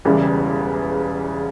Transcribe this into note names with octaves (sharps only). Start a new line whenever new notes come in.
E1 E2 C#3 E3 G3